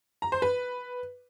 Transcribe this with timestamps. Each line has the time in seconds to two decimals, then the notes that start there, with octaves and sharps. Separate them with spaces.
0.22 A#5
0.32 C5
0.42 B4